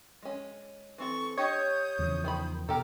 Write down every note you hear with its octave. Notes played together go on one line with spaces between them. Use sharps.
G#3 C#4
E3 C4 A4 C#6
D4 G4 C#5 D#5 D#6 G6
E2 C#3 F3
D#3 C5 B5
B2 G4 A4 A#5 F6